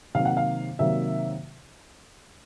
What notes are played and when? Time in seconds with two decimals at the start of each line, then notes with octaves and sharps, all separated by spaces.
0.15 C3 D#3 F#3 A#3 F5
0.25 F#5
0.37 F5
0.79 C3 D#3 F#3 A#3 E5